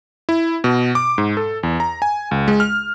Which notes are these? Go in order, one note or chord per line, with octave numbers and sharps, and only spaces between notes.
E4
B2
D6
G#2
A4
E2
A#5
G#5
C#2
G#3
F6